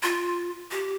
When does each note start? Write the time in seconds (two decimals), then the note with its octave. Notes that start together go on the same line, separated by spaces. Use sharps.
0.03 F4
0.71 G4